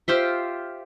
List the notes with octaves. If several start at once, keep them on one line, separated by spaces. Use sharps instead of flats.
F4 G4 C5 E5